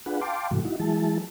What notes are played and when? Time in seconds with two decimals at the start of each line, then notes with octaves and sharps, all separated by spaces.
0.06 D4 F4 G#4 B4 F#5
0.21 F5 G5 A5 C6 D6
0.51 G#2 C3 E3 A3 F#4
0.65 D#4 E4 F#4
0.80 E3 F#3 G#3 E4 G#4 A5